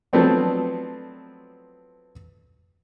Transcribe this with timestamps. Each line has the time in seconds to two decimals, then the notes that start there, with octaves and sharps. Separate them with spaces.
0.13 F3 F#3 A3 B3 C4 D4